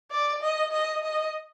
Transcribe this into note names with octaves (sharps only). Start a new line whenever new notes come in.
D5
D#5
D#5
D#5